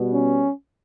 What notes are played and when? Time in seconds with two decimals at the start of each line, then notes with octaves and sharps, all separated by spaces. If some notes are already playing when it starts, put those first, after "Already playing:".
Already playing: B2 G3 B3
0.13 C#4